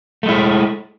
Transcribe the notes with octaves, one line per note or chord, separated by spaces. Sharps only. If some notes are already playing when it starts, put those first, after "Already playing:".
G#3 A3 E4